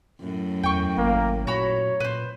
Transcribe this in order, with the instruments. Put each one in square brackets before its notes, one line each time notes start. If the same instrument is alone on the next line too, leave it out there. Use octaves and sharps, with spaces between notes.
[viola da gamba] F#2 A2
[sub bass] E2 [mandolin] G5 C#6
[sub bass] G#1 [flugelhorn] A#3
[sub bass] A#2 [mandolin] F#4 A#5 B5 [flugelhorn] C#5
[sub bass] A#2 [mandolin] B4 C5